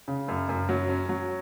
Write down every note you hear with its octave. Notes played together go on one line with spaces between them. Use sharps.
C#3
F#2
F#2
F#3
C#4
F#3